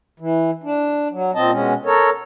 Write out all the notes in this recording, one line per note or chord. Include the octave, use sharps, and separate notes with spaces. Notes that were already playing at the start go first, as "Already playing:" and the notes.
E3
D4
F#3
A#2 C4 D#5 A5
B2 G#3 C#4
A4 A#4 C#5